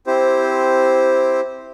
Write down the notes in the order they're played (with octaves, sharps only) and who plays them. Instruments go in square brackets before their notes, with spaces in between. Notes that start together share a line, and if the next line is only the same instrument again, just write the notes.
[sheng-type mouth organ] C4 E4 G4 C5